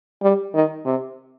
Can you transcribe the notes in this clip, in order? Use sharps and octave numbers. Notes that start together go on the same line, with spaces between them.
G3
D#3
C3